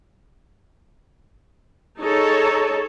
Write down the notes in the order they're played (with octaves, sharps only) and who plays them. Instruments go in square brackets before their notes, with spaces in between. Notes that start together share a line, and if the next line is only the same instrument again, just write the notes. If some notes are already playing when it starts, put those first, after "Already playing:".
[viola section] D#4 G#4 A4 C#5